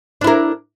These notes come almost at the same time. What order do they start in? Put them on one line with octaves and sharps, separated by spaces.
D4 E4 A#4